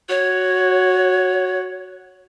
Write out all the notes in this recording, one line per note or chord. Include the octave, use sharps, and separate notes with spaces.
F#4 C#5